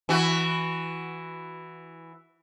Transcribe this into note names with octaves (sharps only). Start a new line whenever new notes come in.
E3 F#4